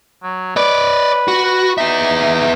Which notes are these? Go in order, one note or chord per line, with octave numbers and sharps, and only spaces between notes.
F#3
B4 C#5 D5
F#4
B4
B3 D#4 E5